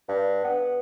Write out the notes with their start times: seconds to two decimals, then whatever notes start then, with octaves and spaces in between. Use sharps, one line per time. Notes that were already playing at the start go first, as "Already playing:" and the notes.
0.08 G2
0.44 B3